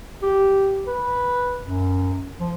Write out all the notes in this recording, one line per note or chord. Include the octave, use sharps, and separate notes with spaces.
G4
B4
F#2
F3